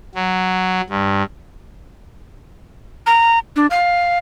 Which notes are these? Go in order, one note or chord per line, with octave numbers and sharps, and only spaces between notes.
F#3
G2
A#5
D4
F5